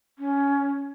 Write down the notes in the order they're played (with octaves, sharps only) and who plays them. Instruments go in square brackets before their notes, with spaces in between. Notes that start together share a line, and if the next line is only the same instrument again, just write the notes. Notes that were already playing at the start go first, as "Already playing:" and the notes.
[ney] C#4